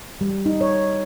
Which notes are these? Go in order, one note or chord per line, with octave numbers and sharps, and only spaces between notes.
G3
D#4
C#5